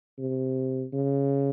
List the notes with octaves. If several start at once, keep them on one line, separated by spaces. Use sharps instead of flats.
C3
C#3